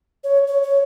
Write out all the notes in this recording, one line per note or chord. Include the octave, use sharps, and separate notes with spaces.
C#5
C#5
C#5